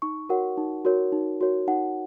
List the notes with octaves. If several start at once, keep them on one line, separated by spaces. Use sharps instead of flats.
D#4 C#6
F#4 A#4 C#5 F#5
D#4
F#4 A#4 C#5
D#4
F#4 A#4 C#5
D#4 F#5